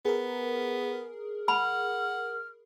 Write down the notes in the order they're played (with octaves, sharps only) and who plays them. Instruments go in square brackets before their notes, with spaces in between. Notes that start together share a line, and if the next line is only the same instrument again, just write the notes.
[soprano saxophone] B3 [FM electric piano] G#4 A#4
[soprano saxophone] F#5 [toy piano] B5 [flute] F6